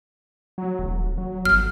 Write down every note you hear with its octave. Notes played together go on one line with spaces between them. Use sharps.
F#3
D#1
F#3
G1 F6